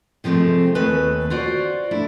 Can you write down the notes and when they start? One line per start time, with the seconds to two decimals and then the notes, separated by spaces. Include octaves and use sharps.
0.24 C3 F3 G#3 A3 C4
0.75 D#2 A3 B4 G#5
1.30 F4 F#4 C5 D5
1.91 A3 D4 E4